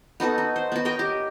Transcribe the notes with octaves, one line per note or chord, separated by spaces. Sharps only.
B3 D#4 F#4 A4
D#4
C5
B3 F#4
A#4 C#5 D#5 G5
G4